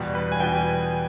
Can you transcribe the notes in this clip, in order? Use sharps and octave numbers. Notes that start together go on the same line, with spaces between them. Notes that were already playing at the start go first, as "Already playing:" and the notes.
Already playing: E2 B2 G3
B4
G#5
E2 B2 G3 G5